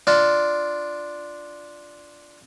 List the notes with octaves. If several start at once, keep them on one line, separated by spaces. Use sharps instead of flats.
D4 F4